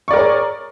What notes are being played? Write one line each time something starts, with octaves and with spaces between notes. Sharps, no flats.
G#4 A#4 C#5 D5 C#6